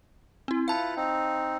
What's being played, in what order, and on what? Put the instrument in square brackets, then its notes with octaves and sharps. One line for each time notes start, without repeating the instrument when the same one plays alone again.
[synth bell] C4 E4
[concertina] E4 F4 B4 [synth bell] F5 A5
[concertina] C4 D#4